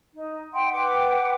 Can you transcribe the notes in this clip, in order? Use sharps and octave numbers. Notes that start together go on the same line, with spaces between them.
D#4
E5 F#5 G5 C6
B4 F#5 G5 D6